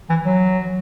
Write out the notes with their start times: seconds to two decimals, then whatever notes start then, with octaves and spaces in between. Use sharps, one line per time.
0.09 E3
0.26 F#3